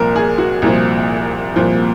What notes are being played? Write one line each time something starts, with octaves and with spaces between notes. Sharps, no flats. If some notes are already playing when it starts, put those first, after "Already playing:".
Already playing: C2 A#2 F3 A#4
G#4
F#4
C2 A#2 F3
C2 A#2 F3